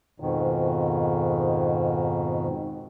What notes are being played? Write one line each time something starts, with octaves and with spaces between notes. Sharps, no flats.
F2 G#2 B2 D#3